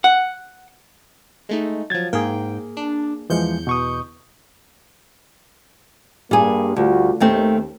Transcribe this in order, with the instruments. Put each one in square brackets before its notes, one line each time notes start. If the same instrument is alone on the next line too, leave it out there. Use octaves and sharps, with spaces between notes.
[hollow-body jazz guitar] F#5
[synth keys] G#3 A3 D#4
[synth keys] F3 F#3 [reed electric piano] G#6 A6
[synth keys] G#2 G5 [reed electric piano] A#3 G#4
[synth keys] D4
[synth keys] E2 G6 C#7 [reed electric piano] E3 F3 G#3
[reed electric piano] B2 C#6 D#6
[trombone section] G2 A#3 [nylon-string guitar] G3 G#4
[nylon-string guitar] D2 [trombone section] G3 F4 F#4
[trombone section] D#2 [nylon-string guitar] D#3 A3 C4